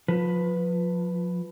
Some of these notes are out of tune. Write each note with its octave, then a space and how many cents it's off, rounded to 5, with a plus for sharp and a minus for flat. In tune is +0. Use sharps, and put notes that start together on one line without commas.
F3 +30 B4 +5